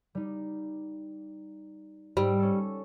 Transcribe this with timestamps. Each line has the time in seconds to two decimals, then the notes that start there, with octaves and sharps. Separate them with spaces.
0.15 G3 D#4
2.17 G#2 G3 E6 D7
2.39 C#4 A4